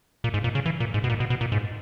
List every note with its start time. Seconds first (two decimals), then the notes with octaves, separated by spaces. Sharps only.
0.24 A#2
0.34 G#2
0.44 A#2
0.55 C#3
0.66 E3
0.80 A#2
0.94 G#2
1.04 B2
1.09 A#2
1.20 B2
1.30 B2
1.41 A#2
1.52 G#2